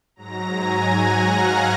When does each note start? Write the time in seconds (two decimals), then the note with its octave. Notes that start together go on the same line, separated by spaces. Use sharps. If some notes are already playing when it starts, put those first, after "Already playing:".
0.16 G#2 F#3 A#5 A#6
0.54 G#5 G#6
0.92 F#5 F#6
1.29 F5 F6